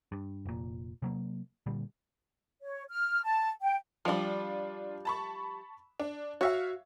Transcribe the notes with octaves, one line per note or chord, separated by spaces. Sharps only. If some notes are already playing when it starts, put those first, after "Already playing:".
G2
F1 A#2
C3 F#3 A#3
A#2 D3 G3
C#5
F6
A5
G5
F3 G3 D4 F4
A5 B5 C#6
D4
F#4 C#5 E5 F5